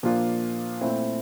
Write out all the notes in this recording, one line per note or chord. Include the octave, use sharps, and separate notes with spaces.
A#2 F3 A#3 D4 F4
A#2 A3 C4 E4